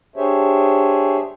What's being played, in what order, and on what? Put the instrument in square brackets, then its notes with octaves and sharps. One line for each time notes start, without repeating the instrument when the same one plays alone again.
[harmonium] D4 G4 G#4 C5 C#5 E5